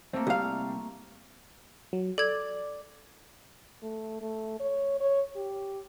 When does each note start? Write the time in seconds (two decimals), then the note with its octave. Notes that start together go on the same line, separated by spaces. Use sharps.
0.13 A3 A#3 C4
0.27 C2 G3 F5
1.93 F#3
2.18 A4 D5 G#6
3.83 A3
4.21 A3
4.60 C#5
5.00 C#5
5.36 G4